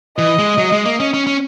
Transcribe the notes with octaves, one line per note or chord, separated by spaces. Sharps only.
E3 D#5
G#3
F#3
G#3
A#3
C#4
C#4
C#4